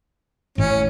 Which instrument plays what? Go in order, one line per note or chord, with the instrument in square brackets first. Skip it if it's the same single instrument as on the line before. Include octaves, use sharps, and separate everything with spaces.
[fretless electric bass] A1 A2 [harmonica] C#4